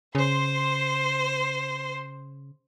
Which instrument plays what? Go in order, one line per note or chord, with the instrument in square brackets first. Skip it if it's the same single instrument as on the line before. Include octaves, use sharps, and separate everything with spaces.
[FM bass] C#3 [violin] C5 C6